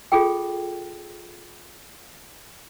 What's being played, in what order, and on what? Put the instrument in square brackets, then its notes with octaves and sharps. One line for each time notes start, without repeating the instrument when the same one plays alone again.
[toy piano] F4 G#4 A4 G5